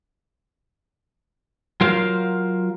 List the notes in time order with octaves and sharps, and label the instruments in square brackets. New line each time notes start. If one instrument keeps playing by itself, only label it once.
[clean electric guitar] F#3 F4 A#4 C5 F5